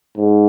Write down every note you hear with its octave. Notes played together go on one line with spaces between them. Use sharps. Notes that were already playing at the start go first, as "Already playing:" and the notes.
G#2